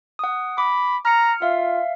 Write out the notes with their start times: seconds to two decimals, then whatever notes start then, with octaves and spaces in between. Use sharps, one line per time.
0.19 F#5 D#6
0.58 B5 D6
1.05 A#5 F6 C#7
1.42 F4 E5 F5